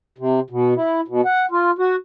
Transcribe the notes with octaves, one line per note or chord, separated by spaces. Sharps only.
C3
B2
E4
B2
F#5
F4
F#4